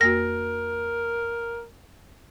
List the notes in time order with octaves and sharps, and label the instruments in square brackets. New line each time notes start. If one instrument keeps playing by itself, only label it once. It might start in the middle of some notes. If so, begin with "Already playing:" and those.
[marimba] F2 A#3 F#4 [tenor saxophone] A#4 [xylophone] A#6